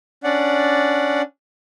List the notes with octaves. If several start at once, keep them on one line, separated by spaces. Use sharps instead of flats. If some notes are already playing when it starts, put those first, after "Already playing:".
C#4 D4 D5 F#5